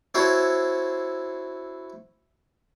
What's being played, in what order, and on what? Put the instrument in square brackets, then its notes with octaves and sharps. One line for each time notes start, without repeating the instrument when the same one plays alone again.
[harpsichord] C4 E4 F#4 A4 C5 C#5